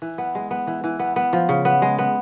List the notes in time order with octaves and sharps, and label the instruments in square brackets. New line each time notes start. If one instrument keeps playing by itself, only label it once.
[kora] E3
B3
G#3
B3
E3
E3
B3
B3
F3
C#3
B3
G#3
B3